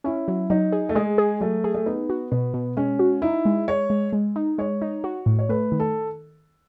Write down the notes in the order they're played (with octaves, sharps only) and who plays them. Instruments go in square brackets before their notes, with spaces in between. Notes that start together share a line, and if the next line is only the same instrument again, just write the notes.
[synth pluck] C#4 [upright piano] E4
[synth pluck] F#3
[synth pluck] F#3 [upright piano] D#4
[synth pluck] G#4
[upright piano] A3
[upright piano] G#3 [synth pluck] G#4
[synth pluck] G#4
[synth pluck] F#3 [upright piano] A3
[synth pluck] G#4
[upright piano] A3
[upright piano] B3 [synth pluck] D#4
[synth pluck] F#4
[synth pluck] B2 [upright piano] B3
[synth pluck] B2
[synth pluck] G#3 [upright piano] C#4
[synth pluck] F#4
[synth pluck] D#4 [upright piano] E4
[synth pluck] G#3
[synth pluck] G#3 [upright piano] C#5
[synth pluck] G#3
G#3
D#4
[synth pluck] G#3 [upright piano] C#5
[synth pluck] D#4
F#4
A2
[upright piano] C#5
[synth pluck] A3 [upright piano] B4
[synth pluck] D#3
[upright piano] A4